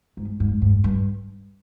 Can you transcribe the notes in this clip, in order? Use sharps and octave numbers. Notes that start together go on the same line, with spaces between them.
G#2
G#2
G#2
G2